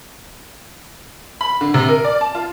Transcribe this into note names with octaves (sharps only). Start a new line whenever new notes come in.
B5
D3
C3
A#4
D5
A5
F4